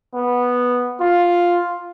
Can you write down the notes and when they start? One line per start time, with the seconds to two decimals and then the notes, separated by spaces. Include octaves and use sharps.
0.14 B3
1.00 F4